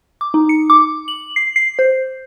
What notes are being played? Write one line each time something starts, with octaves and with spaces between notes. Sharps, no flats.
D6
D#4
C#7
D6
F#7
C7
C7
C5